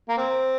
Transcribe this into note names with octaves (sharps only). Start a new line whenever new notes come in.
A#3
C4